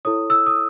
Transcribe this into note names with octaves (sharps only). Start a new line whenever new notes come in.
E4 A4 C#5 D#6
E6
D#6